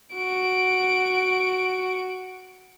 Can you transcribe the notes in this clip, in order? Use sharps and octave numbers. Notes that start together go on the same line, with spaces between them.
F#4 D7